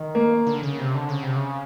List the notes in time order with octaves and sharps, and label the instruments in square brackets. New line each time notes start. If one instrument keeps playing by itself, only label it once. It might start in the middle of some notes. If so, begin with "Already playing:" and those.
Already playing: [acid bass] D#3
[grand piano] A#3
[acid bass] D3
C#3
C3
D3
C#3
C3
C#3